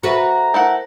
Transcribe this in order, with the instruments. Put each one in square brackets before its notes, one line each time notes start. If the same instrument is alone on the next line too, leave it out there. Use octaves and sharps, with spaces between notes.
[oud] F#4 A4 B4 [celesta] C5 E5 [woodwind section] A#5
[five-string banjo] A3 E4 F#5 [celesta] A#4 C5 A#6